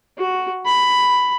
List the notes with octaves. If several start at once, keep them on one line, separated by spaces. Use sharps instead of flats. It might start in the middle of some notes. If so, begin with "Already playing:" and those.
F#4
B5